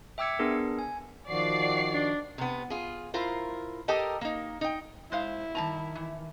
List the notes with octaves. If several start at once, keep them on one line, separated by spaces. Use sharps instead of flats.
E5 G5 D6 E6 G#6 C#7
B3 D4 G#4 A#4
G#5
D#3 F3 F#4 D5 C7
D4
C3 B3
F4 G#4
E4 F4 A#4 C5
G4 A4 A#4 D#5 G5 A5
A#3 D#4
D#4 G5
G#3 E4 C5 F5
D#3 G3 A5 A#5
E3